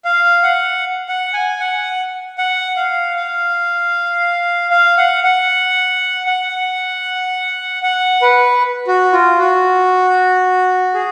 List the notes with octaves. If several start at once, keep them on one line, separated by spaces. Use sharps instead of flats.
F5
F#5
F#5
G#5
F#5
F#5
F5
F5
F5
F#5
F#5
F#5
F#5
B4
F#4
F4
F#4
G#4